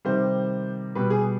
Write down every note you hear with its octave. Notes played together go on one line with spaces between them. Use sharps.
C3 D#3 G3 C5
B2 G3 B4
G#4